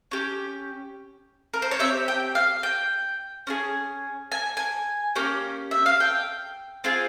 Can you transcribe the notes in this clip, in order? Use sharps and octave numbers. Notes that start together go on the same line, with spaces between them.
C#4 G4
A#4
C5
C#5
C4 G4 E5
G5
F5
G5
C#4 F4 G#4
G#5
G#5
A#3 C#4 G4
E5
F5
G5
C4 F4 G#4